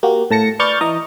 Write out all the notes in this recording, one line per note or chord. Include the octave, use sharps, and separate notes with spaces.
A#3 F#4 G4
A2 A5 A#6 C#7
B4 D5 C#6 F6 G6 A6
E3 D#5 A#5